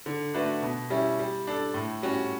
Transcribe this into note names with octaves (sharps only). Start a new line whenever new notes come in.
D3
A3 D4 F#4 B4
B2
G3 C#4 E4
G3
D4 A4
A2
G3 C#4 F#4